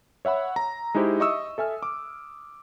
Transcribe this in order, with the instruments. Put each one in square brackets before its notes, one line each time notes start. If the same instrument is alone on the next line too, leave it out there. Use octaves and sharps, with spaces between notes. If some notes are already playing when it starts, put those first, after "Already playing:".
[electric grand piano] C#5 E5 F#5 B5 E6
A#5
G#3 D#4 E4 G4 C5
D#5 E5 C#6 D#6 E6
A4 E5 G#5 F6
D6